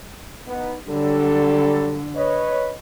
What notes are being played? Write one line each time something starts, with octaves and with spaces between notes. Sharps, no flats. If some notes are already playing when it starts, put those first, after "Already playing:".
B3 D#4
D3 F#3 G3 A4
B4 C#5 D#5